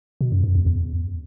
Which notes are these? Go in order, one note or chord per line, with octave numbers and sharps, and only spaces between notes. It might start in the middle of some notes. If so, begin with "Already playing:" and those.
B2
F#2
F#2
E2
E2